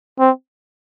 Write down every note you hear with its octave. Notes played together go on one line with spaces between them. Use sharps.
C4